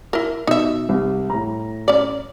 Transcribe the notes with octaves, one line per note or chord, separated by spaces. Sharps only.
E4 A#4
B2 D#4 E5
C2
A2 A#5
C#4 D5